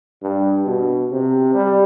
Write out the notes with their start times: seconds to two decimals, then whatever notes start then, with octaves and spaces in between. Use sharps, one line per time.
0.22 G2
0.66 B2
1.11 C3
1.54 G3